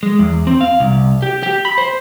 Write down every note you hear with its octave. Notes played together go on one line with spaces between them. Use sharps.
G#3
E2
C4
F5
C2
G4
G4
B5
C5